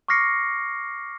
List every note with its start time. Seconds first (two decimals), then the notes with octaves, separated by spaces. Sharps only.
0.08 C#6 D6 F6 A#6 C7 C#7